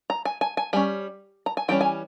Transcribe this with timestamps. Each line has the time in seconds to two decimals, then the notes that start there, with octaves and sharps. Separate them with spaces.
0.10 A#5
0.25 G#5
0.41 G#5
0.57 G#5
0.73 G3 C#4 G#5
1.46 A#5
1.57 G#5
1.68 E3 G3 C#4 G5
1.81 G#5